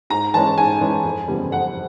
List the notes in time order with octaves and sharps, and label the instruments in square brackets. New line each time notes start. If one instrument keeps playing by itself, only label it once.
[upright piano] G#2 A#5
E3 G#3 C#4 A5
G#2 G#5
E3 G#3 C#4
F2
C#3 E3 G3 B3
F2 F#5